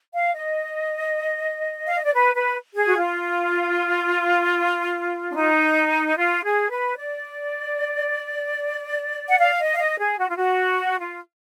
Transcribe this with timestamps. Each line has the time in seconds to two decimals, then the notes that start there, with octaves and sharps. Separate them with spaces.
0.13 F5
0.34 D#5
1.86 F5
1.96 D#5
2.05 D5
2.14 B4
2.35 B4
2.75 G#4
2.87 F#4
2.95 F4
5.32 D4
5.36 D#4
6.17 F4
6.43 G#4
6.71 B4
6.97 D5
9.28 F#5
9.38 F5
9.58 D#5
9.74 F5
9.79 D#5
9.99 G#4
10.19 F#4
10.28 F4
10.36 F#4
10.99 F4